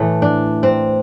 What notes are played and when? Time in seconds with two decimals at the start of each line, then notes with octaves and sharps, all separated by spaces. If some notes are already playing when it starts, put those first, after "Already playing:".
Already playing: A2 E3 A3
0.22 D4
0.63 C4